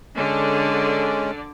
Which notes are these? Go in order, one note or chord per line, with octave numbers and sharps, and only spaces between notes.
D3 G#3 C#4 D5